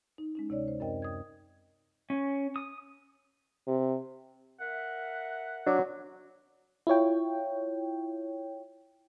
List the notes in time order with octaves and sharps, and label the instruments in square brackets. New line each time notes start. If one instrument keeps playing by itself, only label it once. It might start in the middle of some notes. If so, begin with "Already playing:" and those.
[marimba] D#4
G#3 C#4 D#4
D2 C3 D#4 C#5 D5
C5
F#2 C4 A#4 C5 D#5 G5
G5 D#6 G#6
[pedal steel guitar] C#4
D#6
[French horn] C3
[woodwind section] A#4 E5 F#5
[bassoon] F#3 [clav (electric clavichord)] D4
[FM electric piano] E4 F4 C#5 G5